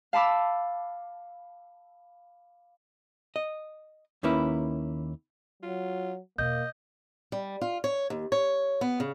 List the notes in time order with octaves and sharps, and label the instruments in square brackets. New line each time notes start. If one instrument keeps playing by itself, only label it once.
[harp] F5 A5 B5 D6 E6
[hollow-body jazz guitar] D#5
D#2 D#3 A#3 C#4 E4 B4
[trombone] F#3 [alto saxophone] F4
[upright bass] E2 B2 [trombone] A#3 [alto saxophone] D#5 [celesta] G6
[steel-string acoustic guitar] G3
F4
C#5
D#2
C#5
B3
C#3